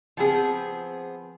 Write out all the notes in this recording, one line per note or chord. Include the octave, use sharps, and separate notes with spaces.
F3 B3 C4 G#4